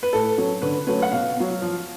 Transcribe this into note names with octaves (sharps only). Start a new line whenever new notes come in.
B4
A2 A4
F#3 C#4
D3 B4
F#3 A3 C#4 B4
F#5
B2 F5
F#3 B3
F3